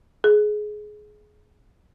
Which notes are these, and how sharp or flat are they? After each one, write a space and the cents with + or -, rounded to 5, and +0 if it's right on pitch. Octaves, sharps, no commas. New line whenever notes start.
G#4 +20